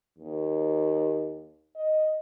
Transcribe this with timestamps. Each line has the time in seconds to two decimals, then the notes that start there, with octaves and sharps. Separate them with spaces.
0.18 D#2
1.76 D#5